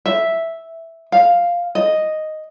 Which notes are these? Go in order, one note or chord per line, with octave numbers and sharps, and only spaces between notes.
E5
F5
D#5